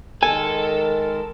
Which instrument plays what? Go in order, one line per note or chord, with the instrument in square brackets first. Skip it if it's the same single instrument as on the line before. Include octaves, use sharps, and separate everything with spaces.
[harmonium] D#3 G#3 A#4 [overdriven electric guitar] A4 [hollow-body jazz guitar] G#5